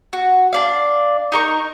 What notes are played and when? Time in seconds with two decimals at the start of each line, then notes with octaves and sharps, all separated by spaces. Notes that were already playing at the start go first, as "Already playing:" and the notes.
0.13 F#4
0.53 D4 D5 F5
1.32 D#4 A#4 C#6